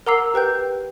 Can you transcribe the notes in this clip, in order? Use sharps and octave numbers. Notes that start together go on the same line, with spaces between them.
A#4 F#5 A#5 D6 E6 C7
G4 B4 G5 G6